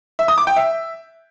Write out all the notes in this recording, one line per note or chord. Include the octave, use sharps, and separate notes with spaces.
E5
D#6
D6
G5
E5